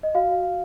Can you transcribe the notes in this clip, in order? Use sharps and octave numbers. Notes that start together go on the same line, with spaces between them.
D#5
F#4 F5